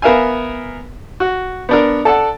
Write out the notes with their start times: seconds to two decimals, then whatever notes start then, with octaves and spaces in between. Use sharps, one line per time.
0.02 B3 A#4 E5 F5 G#5
1.20 F#4
1.69 B3 D4 A#4
2.05 A4 D5 F#5 A5